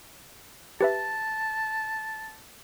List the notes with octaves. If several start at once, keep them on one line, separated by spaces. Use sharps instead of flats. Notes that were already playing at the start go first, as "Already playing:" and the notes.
G4 B4 E5 A5